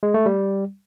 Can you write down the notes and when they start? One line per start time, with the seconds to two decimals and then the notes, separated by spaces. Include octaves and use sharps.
0.03 G#3
0.14 A3
0.26 G3